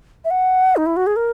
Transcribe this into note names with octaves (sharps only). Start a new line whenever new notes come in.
E5
F#5
D#4
E4
F#4
G#4
A#4